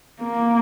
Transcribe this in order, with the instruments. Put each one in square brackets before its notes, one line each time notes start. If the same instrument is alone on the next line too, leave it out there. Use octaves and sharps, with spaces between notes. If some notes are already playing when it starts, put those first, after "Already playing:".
[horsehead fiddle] A#3